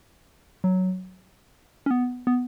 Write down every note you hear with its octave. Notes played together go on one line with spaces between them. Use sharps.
F#3
C#4
B3
B3